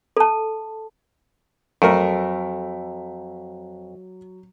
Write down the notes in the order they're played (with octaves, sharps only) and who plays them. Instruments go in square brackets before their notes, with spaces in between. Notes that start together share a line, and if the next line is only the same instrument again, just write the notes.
[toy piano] A4 A5
[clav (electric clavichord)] F2 [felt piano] F#3 [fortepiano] A3 A#4